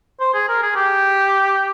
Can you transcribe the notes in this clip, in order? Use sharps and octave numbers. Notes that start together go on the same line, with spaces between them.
C5
G#4
A#4
G#4
G4